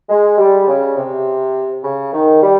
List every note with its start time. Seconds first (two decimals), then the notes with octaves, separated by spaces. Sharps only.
0.09 G#3
0.38 G3
0.68 C#3
0.97 C3
1.83 C#3
2.13 D#3
2.42 G3